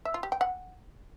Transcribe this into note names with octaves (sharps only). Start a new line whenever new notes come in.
E5
F4
G4
G5
F#5